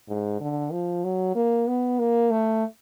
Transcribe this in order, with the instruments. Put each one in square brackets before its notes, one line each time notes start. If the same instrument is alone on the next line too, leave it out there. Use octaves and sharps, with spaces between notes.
[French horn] G#2
D3
F3
F#3
A#3
B3
A#3
A3